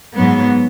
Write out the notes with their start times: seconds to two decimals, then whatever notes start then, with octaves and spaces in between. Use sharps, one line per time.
0.15 G#2 F#3 B3